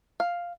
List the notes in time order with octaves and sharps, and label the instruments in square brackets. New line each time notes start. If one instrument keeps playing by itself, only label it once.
[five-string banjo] F5